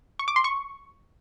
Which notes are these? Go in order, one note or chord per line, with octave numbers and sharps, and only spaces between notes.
C#6
D6
C6
C#6